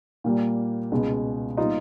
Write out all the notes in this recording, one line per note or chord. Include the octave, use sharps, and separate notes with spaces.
A#2 G3 A#3
C#2 B2 G#3
A#2 G3 B3 D#4 F4